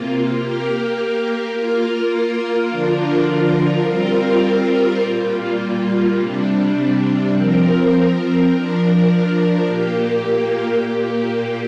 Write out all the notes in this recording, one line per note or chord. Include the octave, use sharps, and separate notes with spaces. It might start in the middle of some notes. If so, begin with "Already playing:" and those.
Already playing: C3 A#3 F4
A#3 G4 A#4
A#3 F4 A#4
D3 F3 D4 F4 A#4
G3 C4 F4 A#4
A#2 G3 A#3 F4
C3 G3 D4
F3 C4 A#4
F3 D4 A#4
A#2 A#3 G4
A#2 A#3 G4